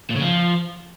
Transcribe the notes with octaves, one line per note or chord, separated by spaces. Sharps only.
A#2
C#3
F3